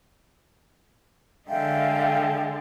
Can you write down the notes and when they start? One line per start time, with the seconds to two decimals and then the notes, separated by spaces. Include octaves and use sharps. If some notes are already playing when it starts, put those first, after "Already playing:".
1.49 D3 G#3 E5 F5 G5